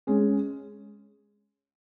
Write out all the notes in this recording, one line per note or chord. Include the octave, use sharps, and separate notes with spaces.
G#3 C#4